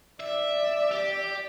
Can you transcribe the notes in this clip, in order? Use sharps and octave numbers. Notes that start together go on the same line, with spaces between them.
D5 E5
G4